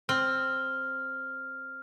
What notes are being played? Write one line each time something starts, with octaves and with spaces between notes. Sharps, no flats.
C4 F6